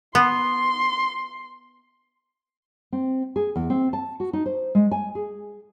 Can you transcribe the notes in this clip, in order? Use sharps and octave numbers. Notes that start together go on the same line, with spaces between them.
B3 C6
C4
G#4
E2
C4
A5
F#4
D#4
C5
G#3
G#5
G#4